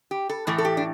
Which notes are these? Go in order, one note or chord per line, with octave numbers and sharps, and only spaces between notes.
G4
A4
A2 E3 A3 A4
A4
G4
D4